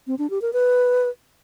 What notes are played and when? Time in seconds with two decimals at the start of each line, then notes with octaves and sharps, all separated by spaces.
0.07 C4
0.19 D4
0.30 G4
0.42 A#4
0.53 B4